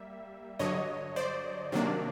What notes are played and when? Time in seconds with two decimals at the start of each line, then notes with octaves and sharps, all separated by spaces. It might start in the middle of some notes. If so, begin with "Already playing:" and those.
Already playing: G3 A#3 E5
0.59 G2 D3 F#3 C#5 D#5
1.16 C5 D5
1.72 C3 D#3 F#3 A#3 D4